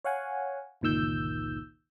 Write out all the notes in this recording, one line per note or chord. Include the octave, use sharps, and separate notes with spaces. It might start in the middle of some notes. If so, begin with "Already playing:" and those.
C#5 F5 F#5 G#5
G1 C#2 A#2 D#3 E6 G6